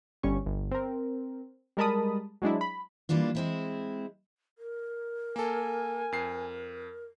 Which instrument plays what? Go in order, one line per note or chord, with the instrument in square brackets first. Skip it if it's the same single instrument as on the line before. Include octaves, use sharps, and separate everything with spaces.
[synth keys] G1 G3 C#4 C#6
G1
C4 A#4
G3 G#3 A#4 A5 B5 D#6
F#3 G#3 D4 E4
B5
[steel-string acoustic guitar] E3 G3 A#3 D4 F4
G#3 C4 E4
[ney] A#4
[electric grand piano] A#3 A4 [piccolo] G#5
[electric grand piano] F2 C7